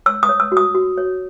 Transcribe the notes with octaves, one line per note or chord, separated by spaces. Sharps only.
C#5 E6
D#6
C#5
E6
F#4
D#6
F#4
C#5